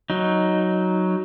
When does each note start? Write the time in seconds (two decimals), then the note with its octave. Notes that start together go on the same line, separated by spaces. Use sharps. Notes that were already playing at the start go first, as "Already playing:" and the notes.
0.10 F#3 D#4